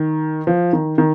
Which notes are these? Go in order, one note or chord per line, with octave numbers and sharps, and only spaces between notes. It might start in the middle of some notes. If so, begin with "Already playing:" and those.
Already playing: D#3
F3
D#3
D#3